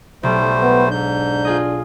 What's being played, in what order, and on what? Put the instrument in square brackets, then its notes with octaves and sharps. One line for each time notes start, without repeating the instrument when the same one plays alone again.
[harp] B1 [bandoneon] G3 A3 C5
[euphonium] B3
[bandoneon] G#2 G6 [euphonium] D4
[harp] F4 G#4 D#5